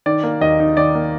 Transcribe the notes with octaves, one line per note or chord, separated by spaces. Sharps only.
D#3 D5
A#3
D#2 D#5
D#4
D#3 D5
A#3